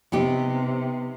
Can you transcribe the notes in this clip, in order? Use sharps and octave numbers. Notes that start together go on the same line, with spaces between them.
C3 B3 D#4 G4